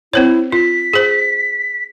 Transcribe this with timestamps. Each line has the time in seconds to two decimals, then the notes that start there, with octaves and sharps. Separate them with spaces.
0.13 C4 E4 C5 C#5
0.52 F4 B6
0.93 G#4 C5